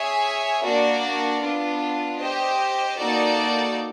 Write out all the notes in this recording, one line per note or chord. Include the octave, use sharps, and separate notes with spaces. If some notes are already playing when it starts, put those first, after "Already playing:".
Already playing: G#4 C#5 E5 G#5
A#3 D4 F#4 A#4 D5
B3 D4 F4
G4 C5 D#5
A#3 D#4 F#4 A4 D5